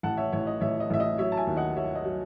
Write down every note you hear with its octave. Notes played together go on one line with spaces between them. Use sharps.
A1 F#5 A5
C#5 E5
A1 C#5 E5
D#5
A1 C#5 E5
D#5
A1 E5
D#5
F#3 C#5 E5
A5
E5 G#5
D#2
D#5 F#5
F#3 C#5 E5
D#5
F#3